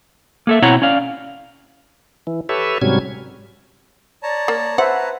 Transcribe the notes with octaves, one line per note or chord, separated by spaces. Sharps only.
A#3 A4 E5
B2 C4 E4 C#5 F#5 A#5
C#4 D5 F5
E3
G4 A4 B4 C#5 E5
G#2 C3 F#3 G3 C#4 G#6
C#5 D5 A5 A#5
A#3
B4 C5 E5 F#5